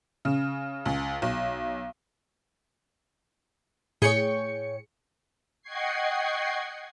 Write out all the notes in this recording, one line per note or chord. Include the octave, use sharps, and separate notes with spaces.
C#3
C#2
B1
A2 G#4 C#5 G5 C#7
D#5 F#5 G5 C#6 G#6 C7